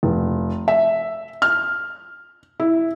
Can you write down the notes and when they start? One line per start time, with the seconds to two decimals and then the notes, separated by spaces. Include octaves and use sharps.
0.03 F1
0.68 E5
1.42 F6
2.60 E4